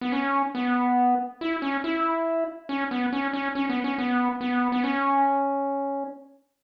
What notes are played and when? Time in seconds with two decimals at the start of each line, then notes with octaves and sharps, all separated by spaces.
0.01 B3
0.12 C#4
0.55 B3
1.41 E4
1.62 C#4
1.84 E4
2.69 C#4
2.91 B3
3.13 C#4
3.33 C#4
3.55 C#4
3.70 B3
3.84 C#4
3.98 B3
4.41 B3
4.72 B3
4.84 C#4